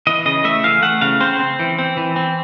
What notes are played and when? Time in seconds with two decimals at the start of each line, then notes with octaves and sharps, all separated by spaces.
0.07 E3 D#5
0.26 C#3 D#5
0.44 A3 E5
0.64 E3 F5
0.82 A3 F#5
1.01 C#3 F5
1.20 C4 C5
1.39 C4
1.60 E3
1.79 C4
1.97 E3
2.16 C4